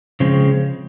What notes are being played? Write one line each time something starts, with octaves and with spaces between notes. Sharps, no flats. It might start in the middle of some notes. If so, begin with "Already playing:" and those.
C#3 F3 G#3 C4